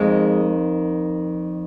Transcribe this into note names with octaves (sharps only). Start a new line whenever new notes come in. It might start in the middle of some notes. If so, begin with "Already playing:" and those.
Already playing: F2 D#3 G#3